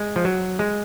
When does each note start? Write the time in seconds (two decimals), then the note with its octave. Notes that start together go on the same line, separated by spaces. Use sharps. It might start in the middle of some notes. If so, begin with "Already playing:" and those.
Already playing: G#3
0.16 F3
0.25 F#3
0.59 G#3